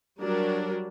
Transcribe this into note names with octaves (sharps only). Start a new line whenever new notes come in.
F#3 G3 D4 A#4